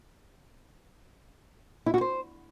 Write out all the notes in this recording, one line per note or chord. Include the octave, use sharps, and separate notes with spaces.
E4
F#4
C5